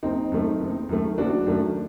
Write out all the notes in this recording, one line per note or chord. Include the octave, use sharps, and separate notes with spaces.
F#1 C4 D#4
F#2 D#3 A3
F#1
F#2 D#3 A3
F#1 D4 F#4
F#2 D#3 A3